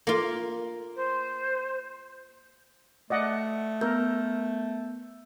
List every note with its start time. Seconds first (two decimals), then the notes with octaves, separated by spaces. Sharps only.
0.07 A#3 F4
0.96 C5
3.10 A3 D5 D#5 F#5
3.81 B3 A#4 E6 G6